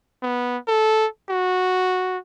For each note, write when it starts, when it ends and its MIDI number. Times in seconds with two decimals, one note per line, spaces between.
0.23 0.57 59
0.68 1.06 69
1.30 2.18 66